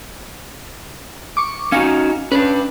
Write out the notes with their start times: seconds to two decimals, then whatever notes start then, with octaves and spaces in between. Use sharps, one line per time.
1.37 C#6 D6
1.72 C#4 D#4 F#4 F5
2.32 C#4 D4 B4